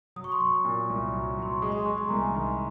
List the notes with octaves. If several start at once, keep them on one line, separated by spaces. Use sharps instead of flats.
F#3 D#6
C#6
C6
F#3 C#6
A#2
C2
F#3
F#3 C6
C#6
G#3 D#6
C6
C#6
G#3
C6
C2 A#5
G#5
D#3 C6